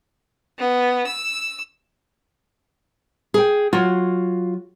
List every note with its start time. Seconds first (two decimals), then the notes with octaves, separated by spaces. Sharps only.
0.59 B3
1.07 E6
3.34 G#4 G5
3.73 F#3 F4 F#4